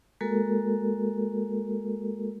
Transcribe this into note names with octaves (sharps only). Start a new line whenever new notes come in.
G#3 A#3 F#4 A4 A#4